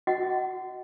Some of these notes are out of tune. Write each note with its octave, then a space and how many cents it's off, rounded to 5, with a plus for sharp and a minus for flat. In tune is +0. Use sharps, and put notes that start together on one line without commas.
F#4 +0 D#5 +0 F#5 +30